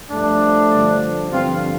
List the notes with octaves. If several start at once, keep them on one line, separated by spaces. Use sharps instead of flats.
G2 F3 A3 D4
G2 D3 F3
G2 D3 F3 C4 F4